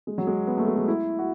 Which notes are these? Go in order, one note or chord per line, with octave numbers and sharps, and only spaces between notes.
G#3
F#3
G#3
B3
A3
G#3
G#3
E4
F#4